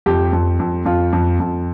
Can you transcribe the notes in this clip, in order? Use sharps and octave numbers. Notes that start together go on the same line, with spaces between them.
F2 G4
F2
F2
F2 F4
F2
F2